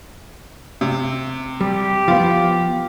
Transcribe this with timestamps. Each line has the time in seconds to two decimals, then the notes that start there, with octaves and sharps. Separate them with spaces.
0.81 C3
1.61 G3 G4
2.08 F3 B3 F4